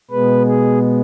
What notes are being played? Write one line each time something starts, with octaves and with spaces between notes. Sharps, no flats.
B2 G#3 B3 B4
G#4